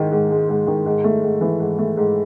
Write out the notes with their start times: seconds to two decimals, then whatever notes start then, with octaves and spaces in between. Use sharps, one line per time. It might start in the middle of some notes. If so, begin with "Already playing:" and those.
Already playing: G#2 D#3 G#3
0.12 G#2
0.31 G#3
0.49 G#2
0.67 D#3
0.86 G#2
1.04 A3
1.23 G#2
1.41 E3
1.60 G#2
1.78 A3
1.97 G#2